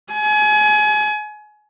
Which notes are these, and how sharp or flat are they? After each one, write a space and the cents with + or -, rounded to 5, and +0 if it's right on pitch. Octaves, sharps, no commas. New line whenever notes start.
G#5 +30